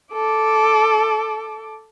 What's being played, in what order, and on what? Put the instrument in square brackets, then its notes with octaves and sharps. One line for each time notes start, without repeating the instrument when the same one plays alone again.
[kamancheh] A4 D6